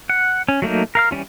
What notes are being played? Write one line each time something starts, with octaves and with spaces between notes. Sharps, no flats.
F#5
C#4
F#3 A3 A#3 D#4
A#4 F5 F6
E3 G3 C#4 F4